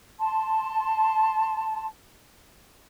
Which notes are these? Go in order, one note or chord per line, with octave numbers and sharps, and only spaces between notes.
A5 C6